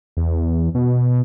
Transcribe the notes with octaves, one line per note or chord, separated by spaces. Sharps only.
E2
B2